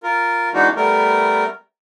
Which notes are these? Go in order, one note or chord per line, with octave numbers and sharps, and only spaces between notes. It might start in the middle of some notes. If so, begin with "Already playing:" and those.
F4 A#4
E3 G#3 B3 D4 D#4 F#4
G3 A3 B3 A#4